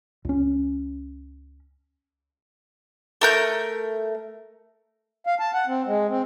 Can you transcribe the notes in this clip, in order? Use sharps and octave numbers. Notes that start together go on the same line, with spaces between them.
C#2 C#4
A3 A#4 G6
F5
A5
F#5
C4
G#3
C4